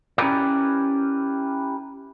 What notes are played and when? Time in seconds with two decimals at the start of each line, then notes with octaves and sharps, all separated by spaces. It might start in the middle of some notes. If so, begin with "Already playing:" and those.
0.18 C#4 E4 G4 A#4 B4 D5